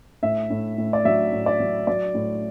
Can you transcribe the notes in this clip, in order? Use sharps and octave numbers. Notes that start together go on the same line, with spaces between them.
A2 E5
A2
A2
D5
F#3 E5
A2
D5
F#3
F#3 D5
A2